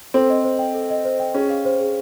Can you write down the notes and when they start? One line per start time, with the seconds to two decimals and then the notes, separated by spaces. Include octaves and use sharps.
0.14 C4 A4
0.30 D#5
0.45 C5
0.59 G5
0.75 A4
0.90 D#5
1.05 C5
1.20 G5
1.34 C#4 G#4
1.50 F5
1.65 C5
1.80 G#4